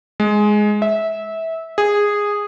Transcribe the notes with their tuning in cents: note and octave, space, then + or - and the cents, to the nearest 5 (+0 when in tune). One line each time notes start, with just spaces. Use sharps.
G#3 +10
E5 -20
G#4 -10